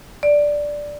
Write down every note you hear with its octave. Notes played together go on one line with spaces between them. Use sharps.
D5